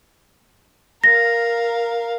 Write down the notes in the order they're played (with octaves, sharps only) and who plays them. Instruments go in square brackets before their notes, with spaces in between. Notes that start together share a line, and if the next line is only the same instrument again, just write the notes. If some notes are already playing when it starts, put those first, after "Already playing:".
[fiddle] A#4 F5 [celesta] A#6